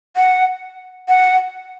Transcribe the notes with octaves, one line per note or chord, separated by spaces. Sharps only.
F#5
F#5